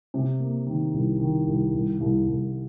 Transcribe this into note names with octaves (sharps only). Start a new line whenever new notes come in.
C3
A#3
D#3
C2
D#3
C2
C2
C2
C2